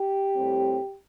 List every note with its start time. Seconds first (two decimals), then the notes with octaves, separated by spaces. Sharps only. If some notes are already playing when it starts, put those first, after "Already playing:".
Already playing: G4
0.34 A2 G3 C4